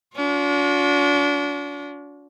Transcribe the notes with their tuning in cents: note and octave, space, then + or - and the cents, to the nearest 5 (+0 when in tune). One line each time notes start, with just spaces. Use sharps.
D4 -40 F#4 -45